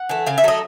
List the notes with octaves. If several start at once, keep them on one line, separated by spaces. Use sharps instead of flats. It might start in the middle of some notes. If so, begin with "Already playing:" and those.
Already playing: F#5
E3 A3
C#3 F5
E5
F#3 A3 D#5